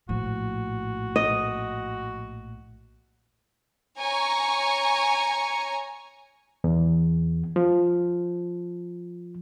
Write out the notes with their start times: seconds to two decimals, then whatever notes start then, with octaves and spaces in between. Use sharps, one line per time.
0.09 A#1 A2 F3 F#4
1.16 D#5
3.98 C#5 G#5 A#5 C#6
6.64 E2
7.56 F3